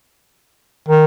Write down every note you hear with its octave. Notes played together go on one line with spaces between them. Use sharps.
D#3